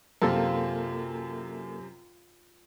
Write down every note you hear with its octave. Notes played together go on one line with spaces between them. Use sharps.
F#2 C3 A#3 C4 F4 A4 A#4